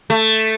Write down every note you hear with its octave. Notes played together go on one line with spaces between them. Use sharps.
A3